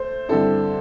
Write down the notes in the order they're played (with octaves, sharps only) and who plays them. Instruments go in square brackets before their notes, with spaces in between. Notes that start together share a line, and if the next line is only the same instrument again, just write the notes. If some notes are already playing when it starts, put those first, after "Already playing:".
Already playing: [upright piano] A3 [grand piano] C5
[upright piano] G2 D3 C4 E4 [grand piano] A4